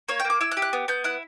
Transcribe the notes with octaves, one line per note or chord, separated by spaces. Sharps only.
A#3 C#5
G5
A#3
D6
E4 E6
F#6
G4
F#6
B3
B3 G6
E4 F#6